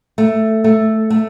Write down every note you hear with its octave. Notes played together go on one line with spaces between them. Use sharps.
A3
A3
A3